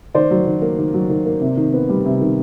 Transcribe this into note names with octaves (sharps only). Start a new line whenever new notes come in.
D#3 C5 D5
F#3
D#3
A#3
D#3
F#3
D#3
A#3
C3
D#3
B3
G3
C3
D#3